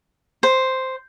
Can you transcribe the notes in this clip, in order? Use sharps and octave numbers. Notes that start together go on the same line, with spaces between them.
C5